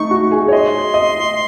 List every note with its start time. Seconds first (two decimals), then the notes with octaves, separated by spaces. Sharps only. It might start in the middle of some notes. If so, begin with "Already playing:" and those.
Already playing: A3 D#4 C#6
0.11 F#4
0.31 G#4
0.48 C#5
0.52 D#5 C6
0.94 D#5